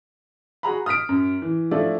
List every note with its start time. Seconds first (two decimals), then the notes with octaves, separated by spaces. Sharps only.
0.63 F#4 G#4 A#5 B5
0.86 D#6 F6 B6 D7
1.09 F#2
1.42 E3
1.71 F3 A3 D4 E4 D5